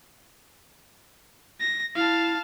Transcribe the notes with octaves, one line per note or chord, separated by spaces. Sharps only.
A#6
E4 F5 A5